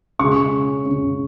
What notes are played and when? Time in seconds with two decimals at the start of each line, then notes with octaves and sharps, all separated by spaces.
0.19 C#3 G#3 C#6
0.85 C#3 G#3